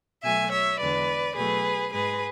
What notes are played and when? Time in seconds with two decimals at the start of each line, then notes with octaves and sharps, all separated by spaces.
0.23 B2 F#3 A3 E5 G#5
0.51 C#5 E5
0.79 E2 D3 G#3 B4 D5
1.35 B2 F#3 A3 G#4 B4
1.92 G#2 G#3 G#4 B4